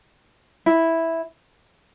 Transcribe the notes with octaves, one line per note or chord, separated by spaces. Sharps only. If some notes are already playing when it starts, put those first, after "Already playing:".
E4